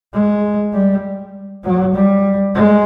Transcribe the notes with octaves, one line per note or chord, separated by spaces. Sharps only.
G#3
G3
F#3
G3
G#3